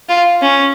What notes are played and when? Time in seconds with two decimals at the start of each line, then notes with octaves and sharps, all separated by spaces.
0.09 F4
0.42 C#4